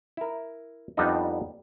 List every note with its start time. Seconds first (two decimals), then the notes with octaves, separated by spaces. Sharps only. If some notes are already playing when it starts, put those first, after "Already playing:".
0.17 E4 A#4
0.97 F2 G3 B3 D4 D#4 D#5